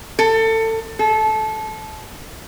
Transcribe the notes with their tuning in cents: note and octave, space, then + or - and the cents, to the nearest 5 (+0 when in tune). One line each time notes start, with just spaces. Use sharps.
A4 +25
A4 -20